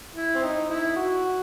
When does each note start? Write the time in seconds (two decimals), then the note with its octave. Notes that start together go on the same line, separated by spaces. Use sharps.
0.15 E4
0.35 C4
0.43 D#4
0.69 E4
0.96 F#4